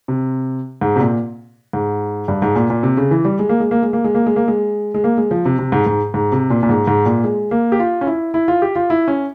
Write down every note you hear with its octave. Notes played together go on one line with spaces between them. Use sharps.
C3
G#2
C3
A#2
G#2
G2
G#2
A#2
A#2
C3
C#3
E3
G3
G#3
A#3
G#3
A#3
G#3
A#3
G#3
A#3
G#3
A#3
G#3
G#3
A#3
G#3
F3
C3
C3
G#2
G#2
G#2
C3
A#2
A#2
G#2
G#2
A#2
G#3
A#3
G4
F4
C#4
E4
E4
F4
G4
F4
E4
C#4